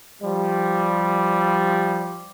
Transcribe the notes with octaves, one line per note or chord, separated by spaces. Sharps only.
F3 G3